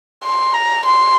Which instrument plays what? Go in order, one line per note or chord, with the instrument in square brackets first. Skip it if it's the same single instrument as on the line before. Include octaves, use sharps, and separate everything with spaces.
[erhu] C6
A#5
C6